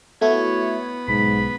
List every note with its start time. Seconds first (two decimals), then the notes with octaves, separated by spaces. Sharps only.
0.21 A3 B3 E4 F#4 C#5
1.08 B1 G#2 B5